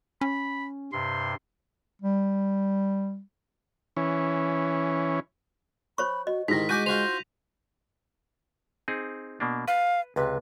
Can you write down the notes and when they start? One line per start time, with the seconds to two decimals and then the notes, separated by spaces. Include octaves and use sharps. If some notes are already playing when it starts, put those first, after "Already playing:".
0.21 C#4 B5
0.93 G2 C3 C6
2.02 G3
3.97 E3 C#4
5.98 C5 C#5 B5 C#6
6.27 F#4 D#5
6.48 G#2 D#3 D#4 E4 G4 B6
6.69 G#3 F#4 G#5 A5 D6 G6 A#6 D#7
6.86 F4 F#4 C5 F7
8.88 C4 D#4 G#4
9.40 B2 A#3 D4
9.68 B4 F5
10.16 C#2 C3 B4